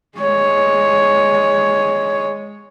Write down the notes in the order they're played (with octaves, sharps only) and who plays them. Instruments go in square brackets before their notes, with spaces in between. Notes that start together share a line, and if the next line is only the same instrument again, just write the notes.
[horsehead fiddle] G#3 C#5